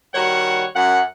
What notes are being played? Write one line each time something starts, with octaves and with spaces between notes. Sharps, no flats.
D#3 G3 F#4 C#5 F#5
F#2 F#5